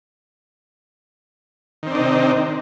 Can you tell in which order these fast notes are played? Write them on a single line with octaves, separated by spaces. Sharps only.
D#3 C4 D4 D#4 C3